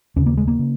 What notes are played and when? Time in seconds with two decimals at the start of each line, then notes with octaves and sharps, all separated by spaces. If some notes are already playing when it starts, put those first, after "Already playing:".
0.16 D#2 C#3 C#4
0.26 A#3
0.37 G#3
0.48 A#3
0.59 C#3